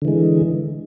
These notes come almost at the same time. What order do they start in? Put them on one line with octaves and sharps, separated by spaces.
D3 E3 G#3